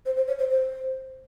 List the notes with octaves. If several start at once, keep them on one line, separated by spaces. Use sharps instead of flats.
C5
C5
C#5
C5
C5